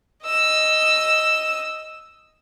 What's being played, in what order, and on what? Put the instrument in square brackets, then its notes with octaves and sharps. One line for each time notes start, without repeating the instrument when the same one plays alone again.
[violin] D#5 E6